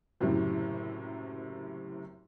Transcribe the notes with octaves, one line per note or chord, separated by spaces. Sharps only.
F#1 F#2 A2 C3